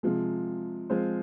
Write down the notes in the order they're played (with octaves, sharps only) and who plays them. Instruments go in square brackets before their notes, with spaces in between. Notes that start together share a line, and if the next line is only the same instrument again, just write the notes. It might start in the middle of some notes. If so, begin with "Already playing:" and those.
[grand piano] C3 F3 G#3
F3 G#3 C4 F4 C5